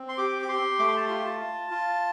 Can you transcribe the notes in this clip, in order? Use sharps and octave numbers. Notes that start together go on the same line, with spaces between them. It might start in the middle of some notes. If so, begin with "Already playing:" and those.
Already playing: C4
C6
G4 D6
D6
G4 C6
A3 D6
C6
A5
F4 C6
A5
F4
F4